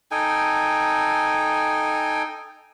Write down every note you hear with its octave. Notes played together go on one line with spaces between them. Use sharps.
D#4 A4 G5 G#5